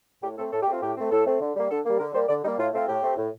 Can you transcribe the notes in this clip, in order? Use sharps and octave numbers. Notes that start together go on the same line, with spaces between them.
A2 G4
A3 C4 A4
A2 A4
G4
A3 C4 F4
A2 G4
A3 C4
A2 A4
A3 C4
D3
G3 A#3
D3 A4
G3 A#3
D3 A#4
G3 A#3 C5
D3 D5
G3 A#3 D#4
A2 F4
A3 C4 F4
A2 G4
A3 C4
A2